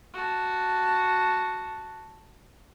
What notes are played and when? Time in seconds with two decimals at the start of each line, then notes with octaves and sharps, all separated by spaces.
0.14 F#4 A5